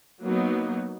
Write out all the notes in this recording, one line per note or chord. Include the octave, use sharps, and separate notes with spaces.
F#3 A#3 B3 D#4